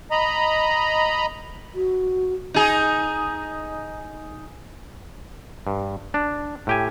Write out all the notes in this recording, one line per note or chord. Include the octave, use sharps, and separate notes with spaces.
D#5 A#5 B5
F#4
D#4 G#4
G2
D4
A2 G4 G#5